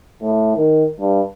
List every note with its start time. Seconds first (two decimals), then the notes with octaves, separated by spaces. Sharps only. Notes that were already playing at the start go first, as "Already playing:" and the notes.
0.22 A2
0.56 D#3
1.00 G2